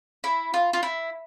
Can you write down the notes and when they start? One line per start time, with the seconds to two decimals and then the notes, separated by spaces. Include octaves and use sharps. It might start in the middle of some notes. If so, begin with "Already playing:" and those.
0.24 E4
0.54 F4
0.73 F4
0.83 E4